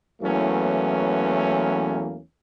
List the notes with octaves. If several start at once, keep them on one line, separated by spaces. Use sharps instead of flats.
E2 E3 F#3 A3 A#3 C#4